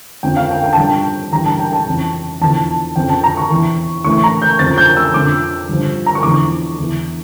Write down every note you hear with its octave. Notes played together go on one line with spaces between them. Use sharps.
F2 D3 F3 G5
F5
G5
G5
A5
G2 D3 F3 G5
G2 E3 A#5
A5
G5
A5
F2 C#3 E3
E2 D3 F3 A5
F2 C#3 F3 G5
A5
A#5
C#6
E2 E3
A2 E3 C#6
A#5
G6
F2 C#3 F3 A6
G6
E6
F2 D3 F3 D6
G2 F3
A#5
C#6
E2 D3 F3 D6
E2 E3